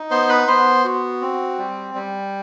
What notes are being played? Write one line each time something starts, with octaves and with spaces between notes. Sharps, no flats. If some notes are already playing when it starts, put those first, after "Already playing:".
Already playing: D#4
B3 C5 C6
B4 B5
B3 C5 C6
F#4
C4
G3
G3